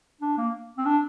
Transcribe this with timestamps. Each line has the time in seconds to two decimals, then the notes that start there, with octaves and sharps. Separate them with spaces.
0.21 D4
0.38 A#3
0.78 C4
0.86 D4